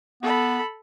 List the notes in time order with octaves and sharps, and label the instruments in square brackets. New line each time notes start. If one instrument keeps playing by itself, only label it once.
[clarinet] B3 [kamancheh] A4 B5